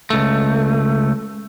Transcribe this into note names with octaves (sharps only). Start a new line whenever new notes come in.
C#2 A3